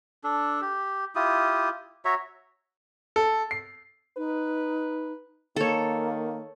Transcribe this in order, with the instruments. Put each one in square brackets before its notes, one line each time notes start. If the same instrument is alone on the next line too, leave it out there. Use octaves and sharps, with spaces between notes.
[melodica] D4 A4
G4
E4 F4 G4 D#6
F#4 C#5 E5 A#5
[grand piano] A4
C7
[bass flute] D#4 [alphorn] B4
[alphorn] D#3 [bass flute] A#3 [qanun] A4 C#5